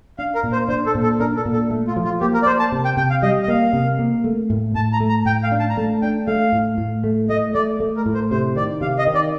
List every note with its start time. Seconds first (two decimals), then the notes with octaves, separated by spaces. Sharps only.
0.19 D4 F5
0.35 A#4
0.43 A#2
0.52 C5
0.68 D4 C5
0.86 A4
0.95 A#2
1.03 A4
1.20 D4 A#4
1.36 A4
1.45 A#2
1.53 A4
1.71 A3
1.88 F4
1.96 F3
2.04 F4
2.21 A#3 G4
2.34 A#4
2.42 D5
2.46 A#3 C5
2.59 A5
2.72 C3
2.85 G5
2.97 C3 G5
3.10 F5
3.22 G3 D#5
3.43 D#5
3.48 A#3 F5
3.73 C3
3.99 A#3
4.24 A3
4.50 A2
4.75 A2 A5
4.93 A#5
5.00 A3
5.09 A#5
5.25 A2 G5
5.43 F5
5.52 D4
5.60 A5
5.70 A#5
5.77 A3 A5
6.02 D4 G5
6.27 A3 F5
6.52 A2
6.78 A2
7.04 A3
7.29 A3 D#5
7.54 A3 D5
7.80 A3
7.96 A#4
8.06 A2
8.14 C5
8.31 C3 C5
8.56 D#3 D5
8.81 C3 F5
8.98 D#5
9.07 D#3
9.15 D5